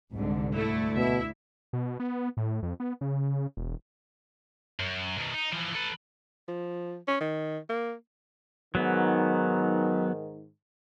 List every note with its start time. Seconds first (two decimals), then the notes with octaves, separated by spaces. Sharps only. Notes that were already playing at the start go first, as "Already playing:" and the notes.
0.13 C2 G#2 D3
0.55 D2 A3 E4 A4
0.97 B2 E4 E5
1.73 B2
2.00 B3
2.37 A2
2.63 F2
2.80 B3
3.01 C#3
3.57 E1
4.79 F#2
5.18 B2 D#3
5.34 D#4
5.53 E3 F3
5.75 A4 B4
6.48 F3
7.08 C#4
7.20 D#3
7.69 A#3
8.75 G#2 D#3 F#3 B3